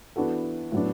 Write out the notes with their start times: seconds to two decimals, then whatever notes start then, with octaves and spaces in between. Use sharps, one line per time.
0.16 E3 B3 D4 F#4 A4
0.72 A2 F#3 B3 D4